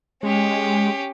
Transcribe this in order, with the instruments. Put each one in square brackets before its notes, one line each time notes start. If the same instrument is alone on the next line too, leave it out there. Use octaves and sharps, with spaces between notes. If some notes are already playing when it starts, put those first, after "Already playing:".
[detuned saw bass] G#3 [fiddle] C#4 G4